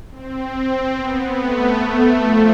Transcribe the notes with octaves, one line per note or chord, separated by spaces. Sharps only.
C4
C4
B3
A3
F3